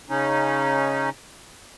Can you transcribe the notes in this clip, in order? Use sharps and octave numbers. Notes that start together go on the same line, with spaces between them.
C#3 C#4 D#4